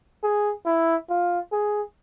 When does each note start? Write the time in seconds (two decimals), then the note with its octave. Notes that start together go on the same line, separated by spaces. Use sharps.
0.24 G#4
0.66 E4
1.10 F4
1.52 G#4